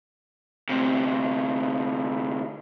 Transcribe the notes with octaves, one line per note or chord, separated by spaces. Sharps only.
D2 C3